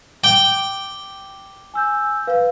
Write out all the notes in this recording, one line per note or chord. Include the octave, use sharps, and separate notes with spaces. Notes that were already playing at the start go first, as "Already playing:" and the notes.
G5 D6
G#5 E6 G6
B4 F5